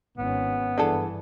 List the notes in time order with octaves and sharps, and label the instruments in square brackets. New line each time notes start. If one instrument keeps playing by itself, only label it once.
[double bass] G#1 C#4 [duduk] B3
[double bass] G2 E3 [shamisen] D4 G#4 A4